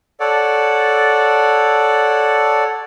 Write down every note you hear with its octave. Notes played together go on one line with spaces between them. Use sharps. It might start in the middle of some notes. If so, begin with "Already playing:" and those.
A4 C#5 D5 F#5